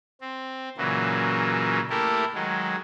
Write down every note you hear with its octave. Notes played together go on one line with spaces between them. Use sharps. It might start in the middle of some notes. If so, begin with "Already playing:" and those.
C4
A#2 C#3 E3 F#3 A#3
A3 A#3 E4 G4 A4 A#4
D#3 F#3 G#3